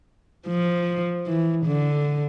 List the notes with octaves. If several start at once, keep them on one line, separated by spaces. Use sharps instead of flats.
F3
E3
D3